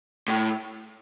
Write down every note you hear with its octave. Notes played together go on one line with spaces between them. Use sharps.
A2